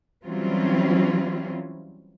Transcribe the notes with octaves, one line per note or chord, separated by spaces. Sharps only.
E3 F#3 G3 C4 C#4 F4